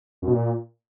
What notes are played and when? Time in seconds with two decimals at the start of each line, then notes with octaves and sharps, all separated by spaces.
0.22 F#2
0.28 B2
0.33 A#2